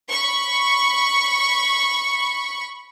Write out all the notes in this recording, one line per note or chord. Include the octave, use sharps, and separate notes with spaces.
B5 C#6